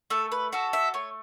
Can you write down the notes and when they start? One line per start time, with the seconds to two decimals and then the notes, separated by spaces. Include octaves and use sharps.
0.10 A3 A4
0.32 B4
0.52 F#4 A4 E5
0.73 E5
0.94 A3 C#5